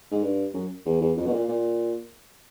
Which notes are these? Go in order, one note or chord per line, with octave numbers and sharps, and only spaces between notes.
G#2
G2
F#2
E2
E2
F2
B2
A#2
A#2